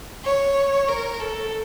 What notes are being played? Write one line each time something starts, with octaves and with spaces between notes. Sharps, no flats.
C#5
A#4
A4